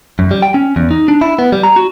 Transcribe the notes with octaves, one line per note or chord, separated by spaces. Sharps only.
F#2
G3
G5
C#4
E2
D#4
D4
E4
B3
G3
A#5
F#4